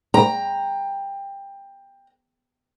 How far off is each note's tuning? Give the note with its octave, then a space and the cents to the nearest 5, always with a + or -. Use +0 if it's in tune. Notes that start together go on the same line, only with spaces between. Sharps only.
G5 +15 A#5 +0